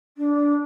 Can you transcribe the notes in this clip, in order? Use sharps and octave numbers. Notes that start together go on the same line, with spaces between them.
D4